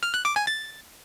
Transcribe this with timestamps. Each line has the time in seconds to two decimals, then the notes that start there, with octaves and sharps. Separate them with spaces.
0.03 F6
0.14 F#6
0.25 D6
0.36 G#5
0.47 A6